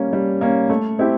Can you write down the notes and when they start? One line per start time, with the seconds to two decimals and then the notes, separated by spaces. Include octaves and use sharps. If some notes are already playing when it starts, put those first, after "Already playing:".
Already playing: G3 A#3 C#4
0.13 G3
0.41 A#3 C#4
0.70 A3
0.99 C4 E4 G4